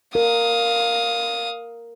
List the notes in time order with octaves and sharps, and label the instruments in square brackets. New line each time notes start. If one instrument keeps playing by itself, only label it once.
[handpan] A#4 [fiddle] F5 D#6